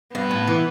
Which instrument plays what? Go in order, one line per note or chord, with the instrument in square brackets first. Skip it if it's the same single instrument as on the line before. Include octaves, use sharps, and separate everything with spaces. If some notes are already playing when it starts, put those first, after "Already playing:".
[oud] G2 [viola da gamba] B3
[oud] A2
E3